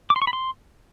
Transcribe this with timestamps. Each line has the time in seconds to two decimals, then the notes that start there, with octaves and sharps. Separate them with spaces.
0.10 D6
0.16 C6
0.22 C#6
0.27 B5
0.33 C6